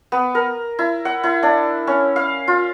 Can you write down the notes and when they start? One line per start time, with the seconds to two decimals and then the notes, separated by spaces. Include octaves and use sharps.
0.12 B3
0.35 A#4
0.79 E4
1.05 F#5
1.24 E4
1.43 D4
1.87 C#4
2.16 F5
2.48 F4